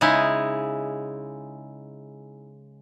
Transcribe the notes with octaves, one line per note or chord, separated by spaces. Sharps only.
C#3 G#3 D#4 E4